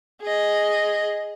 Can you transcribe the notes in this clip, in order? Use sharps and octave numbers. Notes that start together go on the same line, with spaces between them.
G#4 D#5